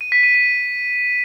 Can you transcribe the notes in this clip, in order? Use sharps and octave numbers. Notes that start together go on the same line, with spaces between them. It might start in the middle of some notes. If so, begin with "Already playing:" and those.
D#7
B6
D#7
D#7